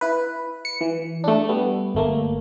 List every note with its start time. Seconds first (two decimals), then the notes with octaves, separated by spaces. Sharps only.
0.01 E4 B4
0.65 C#7
0.81 E3
1.24 A3 D4
1.49 G3 B3
1.95 G1 A3 A#3